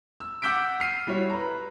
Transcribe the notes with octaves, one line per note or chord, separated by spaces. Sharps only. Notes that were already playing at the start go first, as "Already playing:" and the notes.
E6
F#5 D6 E6 G6 B6 D7
F6 C7 D#7
G3 E4 F#4 C#5
B4 A#5